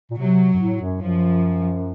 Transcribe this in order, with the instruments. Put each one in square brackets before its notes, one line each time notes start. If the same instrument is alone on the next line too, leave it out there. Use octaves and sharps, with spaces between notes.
[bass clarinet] A#2
[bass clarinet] C3 [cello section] F#3
[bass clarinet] F#2
A2
F#2
[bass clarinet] F#2 [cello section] F3